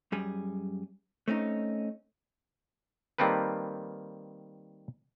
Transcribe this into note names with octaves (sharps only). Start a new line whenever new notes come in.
F#2 G3 G#4
A3 C4 C#4 D#4
D#3 G3 A#3 C4 A4 B4